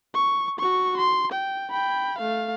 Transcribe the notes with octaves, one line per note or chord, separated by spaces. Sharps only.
C#6
F#4 C#6
C6
G5
G5 B5
A3 F5